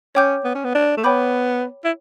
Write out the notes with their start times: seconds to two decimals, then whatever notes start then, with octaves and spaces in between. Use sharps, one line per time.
0.15 C#4 C#5 G5 D6 G6
0.44 B3
0.55 C#4
0.64 B3
0.75 D4
0.97 A3
1.04 B3 C#5 G5 B5 D6 G6
1.85 E4